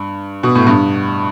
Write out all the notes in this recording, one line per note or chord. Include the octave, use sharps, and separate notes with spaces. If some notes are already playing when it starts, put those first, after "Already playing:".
Already playing: G2
B2
A2
G2